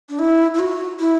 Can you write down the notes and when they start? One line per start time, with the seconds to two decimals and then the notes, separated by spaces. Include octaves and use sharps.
0.09 D4
0.19 E4
0.54 E4
0.59 F#4
1.00 E4